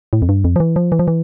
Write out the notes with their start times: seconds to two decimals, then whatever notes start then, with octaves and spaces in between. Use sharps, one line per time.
0.13 A2
0.22 F2
0.29 G2
0.44 F2
0.56 F3
0.60 E3
0.76 F3
0.92 E3
0.99 F3
1.08 E3